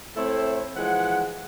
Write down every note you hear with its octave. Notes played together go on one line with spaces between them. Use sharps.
A3 C4 E4 A4 C5 C#5
E3 F3 G#3 F#5